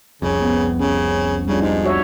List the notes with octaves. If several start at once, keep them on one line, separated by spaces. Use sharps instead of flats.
F1 C2 F2 C#3
B3 C4
C#3 C#4
C#3 G3 D4 F4
G#2 D#4
F#4 C#5 E5